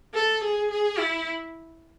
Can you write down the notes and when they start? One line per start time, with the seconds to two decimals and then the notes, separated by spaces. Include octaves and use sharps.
0.14 A4
0.43 G#4
0.71 G#4
0.98 E4